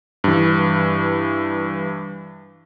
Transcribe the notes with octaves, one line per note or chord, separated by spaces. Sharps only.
G2 E3